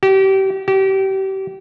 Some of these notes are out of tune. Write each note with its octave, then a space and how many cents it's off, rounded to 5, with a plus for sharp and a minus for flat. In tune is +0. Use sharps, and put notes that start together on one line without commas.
G4 -30
G4 -30